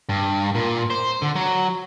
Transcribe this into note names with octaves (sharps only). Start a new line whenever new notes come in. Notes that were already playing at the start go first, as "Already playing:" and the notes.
G2
A#2
C5
D3
F#3